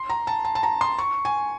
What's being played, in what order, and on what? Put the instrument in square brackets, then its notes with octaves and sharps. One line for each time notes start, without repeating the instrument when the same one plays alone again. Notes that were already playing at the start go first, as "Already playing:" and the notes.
Already playing: [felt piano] C6
A#5
A5
A5
A5
A#5
C6
C#6
G#5